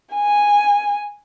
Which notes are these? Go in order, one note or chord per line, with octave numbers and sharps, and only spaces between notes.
G#5